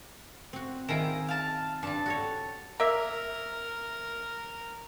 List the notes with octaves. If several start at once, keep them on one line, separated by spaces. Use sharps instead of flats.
C4 F#4
D#3 E4 F4 G#4 G5 A#5
F5 A5
G2 G3 A5
F#4 A4 C#5
A#3 A#4 E5